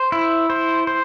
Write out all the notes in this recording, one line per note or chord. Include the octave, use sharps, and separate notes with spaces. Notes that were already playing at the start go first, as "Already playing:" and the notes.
Already playing: C5
E4
C5
C5